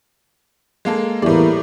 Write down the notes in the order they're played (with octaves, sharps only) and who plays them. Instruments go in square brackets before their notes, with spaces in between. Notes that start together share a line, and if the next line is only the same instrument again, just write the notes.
[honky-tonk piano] G#3 A#3 A4
[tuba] E2 [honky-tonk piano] A2 D5 [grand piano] G3 [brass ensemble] A#3 E4